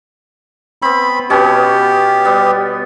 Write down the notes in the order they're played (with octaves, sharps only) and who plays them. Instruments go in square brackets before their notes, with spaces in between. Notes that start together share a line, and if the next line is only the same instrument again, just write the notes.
[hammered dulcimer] B3 C4 [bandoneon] B5
[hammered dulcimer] B2 B3 C#4 [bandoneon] G4
[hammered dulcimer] G3 B3